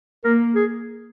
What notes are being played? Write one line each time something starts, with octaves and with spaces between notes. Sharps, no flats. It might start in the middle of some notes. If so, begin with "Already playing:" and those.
A#3 A#4
G#4